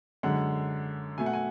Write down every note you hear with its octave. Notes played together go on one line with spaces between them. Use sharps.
F#2 D3 G#3 F#5
B2 A3 G#5
F#5
G#5